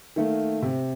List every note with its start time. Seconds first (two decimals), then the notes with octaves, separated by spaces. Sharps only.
0.16 D#3 A3 A#3
0.62 C3